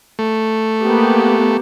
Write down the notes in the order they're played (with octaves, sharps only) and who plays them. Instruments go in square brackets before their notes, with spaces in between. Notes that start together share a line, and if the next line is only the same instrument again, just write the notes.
[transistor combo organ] A3
[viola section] A#3 B3 G4